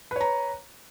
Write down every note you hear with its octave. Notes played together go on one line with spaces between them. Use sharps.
B4 C#5 A#5